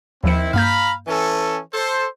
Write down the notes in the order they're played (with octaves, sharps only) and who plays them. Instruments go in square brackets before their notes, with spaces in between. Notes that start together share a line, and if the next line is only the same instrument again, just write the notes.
[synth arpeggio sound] D#2 F3 C#7 [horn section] D#3 C4 E4
[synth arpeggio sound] G2 A#3 G6 [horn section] F5 A#5 B5
[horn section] E3 C#4 A4
A4 C5